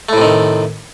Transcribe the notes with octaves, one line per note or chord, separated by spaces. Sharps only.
A2 C3 D#3 A3